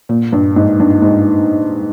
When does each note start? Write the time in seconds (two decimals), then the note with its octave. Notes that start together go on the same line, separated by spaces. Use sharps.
0.09 A#2
0.32 G2
0.56 G#2
0.80 G2
1.02 G#2